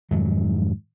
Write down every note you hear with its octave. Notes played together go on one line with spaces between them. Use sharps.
F2 G#2 D#3 F#3